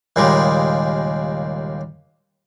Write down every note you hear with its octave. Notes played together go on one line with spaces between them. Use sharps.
D#2 A#2 C#3 G3 G#3